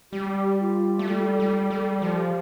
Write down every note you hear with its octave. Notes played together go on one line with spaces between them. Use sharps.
G3 G4
F4
A3
G3 A4
G3
G3
F3 G4